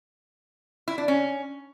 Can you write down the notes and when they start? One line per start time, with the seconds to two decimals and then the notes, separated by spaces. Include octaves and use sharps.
0.88 E4
0.98 D4
1.08 C#4